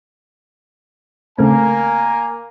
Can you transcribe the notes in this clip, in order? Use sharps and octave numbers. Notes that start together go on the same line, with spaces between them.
C#3 A3 A#3 C4 A#4 G#5